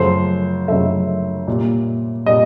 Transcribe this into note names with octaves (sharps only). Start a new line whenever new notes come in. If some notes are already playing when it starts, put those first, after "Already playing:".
Already playing: F#2 C#3 F3 A3 C5
F#2 C#3 F3 A3 E5
A#2 G3
A#2 G3 D#5